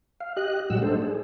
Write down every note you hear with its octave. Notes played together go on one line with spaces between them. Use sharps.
F5
G4 D#5 F#6
A2 F#3 G3 G4 F#5 E6
A3 D4 D#4 A4 C5
G#4